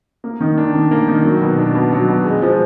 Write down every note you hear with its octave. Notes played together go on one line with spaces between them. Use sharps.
A#3
D#3
D4
D#3
A#3
D#3
F#3
B2
D4
B2
F#3
B2
G#3
F3